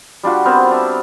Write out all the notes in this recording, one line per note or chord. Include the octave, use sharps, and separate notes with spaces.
G3 D4 F4 F#4
B3 C4 A#4 C5
D4 E5